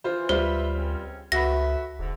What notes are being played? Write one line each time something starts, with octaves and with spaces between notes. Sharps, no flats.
E3 F4 C5
D2 G3 F4 B4 C5 E5
C#2 C4 C#4
C#2 A3 F#4 B4 E5 A#6
E1 G#2 D3